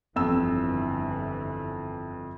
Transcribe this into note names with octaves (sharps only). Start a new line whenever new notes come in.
G1 F2 E3 E6